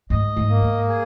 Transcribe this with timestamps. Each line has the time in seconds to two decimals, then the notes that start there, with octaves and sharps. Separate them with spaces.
0.10 G#2 D#5
0.36 G#2
0.49 A#3
0.62 G#2
0.88 G#4